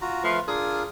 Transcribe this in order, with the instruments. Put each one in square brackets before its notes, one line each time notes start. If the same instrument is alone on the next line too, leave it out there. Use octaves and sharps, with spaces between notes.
[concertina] F4 F#4 A#5
[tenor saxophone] F3 [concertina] A3 B4 F5
[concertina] D4 F4 A#4 [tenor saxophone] G#4